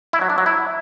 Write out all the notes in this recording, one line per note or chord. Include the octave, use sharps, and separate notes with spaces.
E4
F#3
D4
F#3
E4